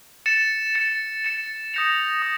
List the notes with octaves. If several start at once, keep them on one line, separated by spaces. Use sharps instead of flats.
A6 C#7 E7
A6 C#7 E7
A6 C#7 E7
D#6 G6 A#6 C#7 F7
D#6